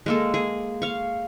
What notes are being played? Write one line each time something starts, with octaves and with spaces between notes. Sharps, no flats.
G#3 A#3 A4
G#4
F5 C#6